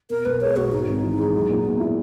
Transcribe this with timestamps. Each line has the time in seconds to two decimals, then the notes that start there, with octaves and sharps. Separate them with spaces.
0.10 B2 A#4
0.25 B1 B4
0.41 G#3 C#5
0.56 B1 F#4
0.72 G#2 D#4
0.88 G#1
1.03 E3
1.19 G#3
1.34 F#3
1.49 A#2
1.65 B3
1.80 E4